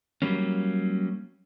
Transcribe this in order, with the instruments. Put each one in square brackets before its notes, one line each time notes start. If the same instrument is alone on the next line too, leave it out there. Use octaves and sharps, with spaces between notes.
[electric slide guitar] F#3 G3 A#3 C#4